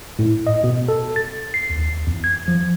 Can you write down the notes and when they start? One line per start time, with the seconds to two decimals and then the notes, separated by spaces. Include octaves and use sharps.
0.19 A2
0.47 D#5
0.64 B2
0.88 A4
1.16 A6
1.54 C7
1.70 D#2
2.07 E2
2.24 G#6
2.48 F3